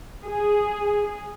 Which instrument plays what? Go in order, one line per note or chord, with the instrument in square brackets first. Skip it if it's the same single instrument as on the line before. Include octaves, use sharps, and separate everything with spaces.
[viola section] G#4